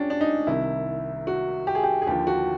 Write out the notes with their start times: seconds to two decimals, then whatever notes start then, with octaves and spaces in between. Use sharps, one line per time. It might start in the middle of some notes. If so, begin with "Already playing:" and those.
Already playing: F3 C#4 D4 G4
0.10 D4
0.21 D#4
0.47 C2 C3 D#3 E4
1.27 F#4
1.67 G4
1.75 G#4
1.83 G4
2.02 G#4
2.07 D#2 D3 F3 G4
2.27 F#4